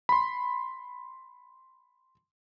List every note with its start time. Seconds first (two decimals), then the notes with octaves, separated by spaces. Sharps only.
0.09 B5 C6